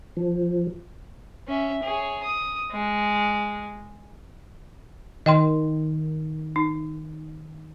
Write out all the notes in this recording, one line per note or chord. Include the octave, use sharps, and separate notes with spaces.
F3
C#4 E5
G#4 C#5
D#6
G#3
D#3 D#5 G5 C6
D#4